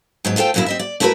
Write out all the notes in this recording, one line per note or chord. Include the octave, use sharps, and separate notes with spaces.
G#2 F#3 B3
A3 F4 A4 C5 G5
F#2 A#2 F#3 A#3 E4
C4 D#5 E5
D5
A3 E4 F#4 G#4 A#4 B4